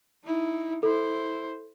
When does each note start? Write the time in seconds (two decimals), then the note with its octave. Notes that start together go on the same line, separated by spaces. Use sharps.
0.25 D#4 E4
0.83 E4 A4 C5